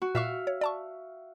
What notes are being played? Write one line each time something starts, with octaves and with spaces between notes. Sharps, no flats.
F#4
A#2 E5 F5 C#6
C#5
D5 A5 C#6